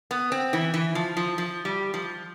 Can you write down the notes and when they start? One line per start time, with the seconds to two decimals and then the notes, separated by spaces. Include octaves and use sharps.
0.11 B3
0.32 C4
0.53 E3
0.74 E3
0.95 F3
1.17 F3
1.38 F3
1.65 G3
1.94 F3